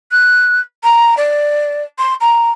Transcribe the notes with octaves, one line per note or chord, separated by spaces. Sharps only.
F#6
A#5
D5
C6
A#5